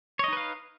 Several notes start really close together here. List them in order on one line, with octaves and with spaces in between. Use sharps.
C#5 D#5 D#4 B4 F5